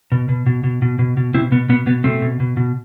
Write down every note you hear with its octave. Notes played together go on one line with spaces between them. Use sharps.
B2
B2
B2
B2
B2
B2
B2
B2 C4 E4
B2 B3
B2 B3
B2 B3
B2 A3 C4
B2
B2
B2